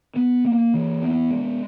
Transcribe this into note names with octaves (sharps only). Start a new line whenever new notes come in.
B3
A#3
E3
B3
G#3